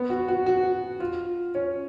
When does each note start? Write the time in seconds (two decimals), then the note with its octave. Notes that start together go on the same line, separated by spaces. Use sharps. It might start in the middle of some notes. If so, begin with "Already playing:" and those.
Already playing: B3
0.10 F#4
0.28 F#4
0.46 F#4
1.00 F4
1.55 C#4